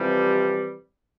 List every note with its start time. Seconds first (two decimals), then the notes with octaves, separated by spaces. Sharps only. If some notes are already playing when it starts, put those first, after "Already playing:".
Already playing: F2 C3 E3 G3